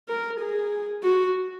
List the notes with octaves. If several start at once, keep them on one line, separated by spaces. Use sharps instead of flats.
A#4
G#4
F#4